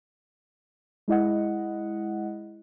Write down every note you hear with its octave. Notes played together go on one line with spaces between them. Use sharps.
G#3 E4 D#5 F#5